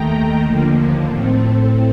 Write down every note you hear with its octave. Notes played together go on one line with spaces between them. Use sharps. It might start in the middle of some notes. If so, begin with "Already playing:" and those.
Already playing: D#2 D#3 A3 G5 A#5
D#2 D3 F3 A#3
A2 A3 C4